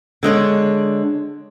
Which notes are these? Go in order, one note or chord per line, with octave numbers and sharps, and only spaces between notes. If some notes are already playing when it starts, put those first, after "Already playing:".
D3 G#3 D4 C#5